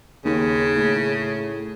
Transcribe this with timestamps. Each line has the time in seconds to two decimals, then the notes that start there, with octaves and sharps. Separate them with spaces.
0.25 D#2 C#3
0.76 A2